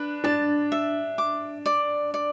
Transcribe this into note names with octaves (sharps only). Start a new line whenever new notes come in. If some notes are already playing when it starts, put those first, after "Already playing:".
Already playing: D4 B4
D4 A5
E5
D6
D5
D5